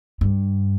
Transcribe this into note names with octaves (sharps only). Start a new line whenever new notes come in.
G2